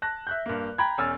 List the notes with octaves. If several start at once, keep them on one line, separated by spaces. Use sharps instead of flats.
A5 F#6 A#6
E5 F#6 G6
G2 A#3
G5 A#5 B5 G#6
E1 C#4 G#5 E6 F6 A6